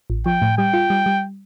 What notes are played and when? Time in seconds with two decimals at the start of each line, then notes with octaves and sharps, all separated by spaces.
0.10 A1
0.26 F3 G5
0.42 A2
0.58 G3 G5
0.73 F4
0.90 G3
1.06 G3